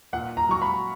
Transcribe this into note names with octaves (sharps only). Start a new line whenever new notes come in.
A#2 F#5
A#5
F#3 C#6
B5